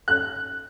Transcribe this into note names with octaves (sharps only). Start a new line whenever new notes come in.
F#6